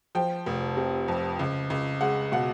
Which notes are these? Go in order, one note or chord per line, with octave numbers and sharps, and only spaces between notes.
F3 G5
F1
C3
F2
C#2
C#2
G#3 F#5
B2 F#5